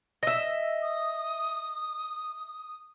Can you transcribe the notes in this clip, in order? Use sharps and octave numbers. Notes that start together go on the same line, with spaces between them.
D#5 E5
D#6